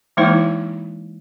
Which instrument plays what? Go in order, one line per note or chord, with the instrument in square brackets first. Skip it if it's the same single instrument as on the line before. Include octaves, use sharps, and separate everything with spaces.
[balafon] E3 G#3 A#3 D#4 E4 C5